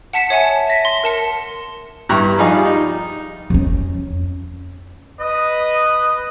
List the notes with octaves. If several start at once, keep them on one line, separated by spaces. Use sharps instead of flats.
F#5 A5 B6 C#7 E7
C#5 E5 F#5 G#5 A5
A#6 B6
C6
A#4 A5 C#7
G2 E4 G4 A#5 C#6 F#6
F3 G3 D#4 G#4 F5
D#4
F2 C#4
B4 D#5